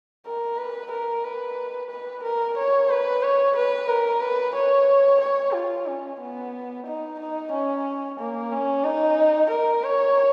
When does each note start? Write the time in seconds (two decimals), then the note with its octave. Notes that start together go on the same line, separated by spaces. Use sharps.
0.26 A#4
0.58 B4
0.91 A#4
1.24 B4
1.90 B4
2.24 A#4
2.57 C#5
2.90 B4
3.23 C#5
3.56 B4
3.88 A#4
4.21 B4
4.56 C#5
5.21 C#5
5.54 F4
5.87 C#4
6.21 B3
6.86 D#4
7.19 D#4
7.52 C#4
8.19 A#3
8.52 C#4
8.85 D#4
9.51 A#4
9.84 C#5